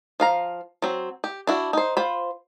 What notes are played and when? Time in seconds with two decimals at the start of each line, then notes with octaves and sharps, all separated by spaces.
0.20 F3 F5 A#5
0.82 F#3 C4
1.24 G4
1.47 D4 E4 F#4
1.73 D#4 C5
1.97 F4 C5 B5